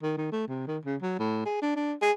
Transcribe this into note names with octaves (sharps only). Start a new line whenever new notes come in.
D#3
D#3
A3
C3
D#3
C#3
F#3
A2
G#4
D4
D4
G#4